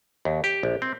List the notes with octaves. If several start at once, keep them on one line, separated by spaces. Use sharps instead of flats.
D#2
G4
A#1
C4